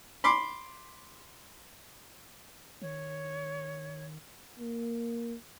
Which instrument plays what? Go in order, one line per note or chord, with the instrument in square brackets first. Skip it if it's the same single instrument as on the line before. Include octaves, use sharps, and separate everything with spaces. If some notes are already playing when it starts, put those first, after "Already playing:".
[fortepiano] B5 C6 D6
[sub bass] D#3 [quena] C#5
[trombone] A#3